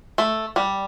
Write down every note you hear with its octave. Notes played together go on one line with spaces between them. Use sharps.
A3
G3